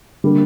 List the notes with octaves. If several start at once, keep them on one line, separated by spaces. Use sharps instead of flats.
D3 G3 A#3